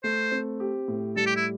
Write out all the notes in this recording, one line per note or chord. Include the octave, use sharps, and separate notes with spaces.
A3 C5
C4
G4
A2
G3 A4
G4
E4